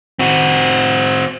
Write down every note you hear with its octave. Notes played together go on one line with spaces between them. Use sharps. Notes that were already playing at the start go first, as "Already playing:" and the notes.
C4 F#4